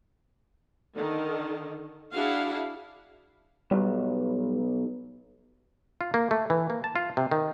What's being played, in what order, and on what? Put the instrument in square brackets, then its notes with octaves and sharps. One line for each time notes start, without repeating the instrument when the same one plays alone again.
[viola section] D3 D#3
D4 E4 F#4 G#4 F5 F#5
[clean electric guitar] B1 [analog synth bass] G3
[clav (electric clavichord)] F4
A#3
A3
E3
A#3
A5
F4
C3
D#3